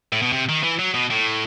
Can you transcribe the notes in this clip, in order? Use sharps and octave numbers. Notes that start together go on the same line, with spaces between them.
A2
B2
C3
D#3
E3
F#3
B2
A2